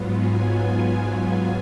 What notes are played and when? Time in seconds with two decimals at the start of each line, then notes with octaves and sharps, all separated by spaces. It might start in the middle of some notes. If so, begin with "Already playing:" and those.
Already playing: G#2 F#3 B3 F4
0.10 G#5